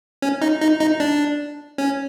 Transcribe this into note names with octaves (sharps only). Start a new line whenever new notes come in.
C#4
D#4
D#4
D#4
D4
C#4